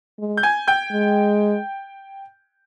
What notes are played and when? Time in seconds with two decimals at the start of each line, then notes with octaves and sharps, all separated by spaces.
0.19 G#3
0.37 G6
0.43 G#5 G#6
0.68 G5 G6
0.92 G#3